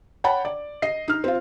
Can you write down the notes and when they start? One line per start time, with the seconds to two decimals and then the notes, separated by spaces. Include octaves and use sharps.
0.24 C#5 F#5 G5 A5 B5
0.45 D5
0.82 D#5 C7
1.08 D#4 F6
1.24 C4 F4